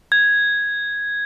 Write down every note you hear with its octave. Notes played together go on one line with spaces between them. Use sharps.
G#6